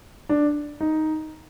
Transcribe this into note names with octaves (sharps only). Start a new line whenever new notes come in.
D4
D#4